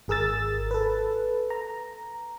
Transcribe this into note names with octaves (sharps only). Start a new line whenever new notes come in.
G#1 G#4 A#4 E6 A6
A4 B4
A#5